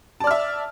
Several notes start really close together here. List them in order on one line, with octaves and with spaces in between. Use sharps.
A5 D5 F6 E5